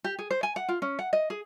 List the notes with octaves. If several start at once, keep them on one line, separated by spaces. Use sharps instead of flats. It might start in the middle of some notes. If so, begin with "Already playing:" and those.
G4
G#4
C5
G#5
F#5
F4
C#4
F#5
D#5
G#4